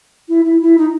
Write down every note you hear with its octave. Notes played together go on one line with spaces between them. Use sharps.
E4
E4
E4
D#4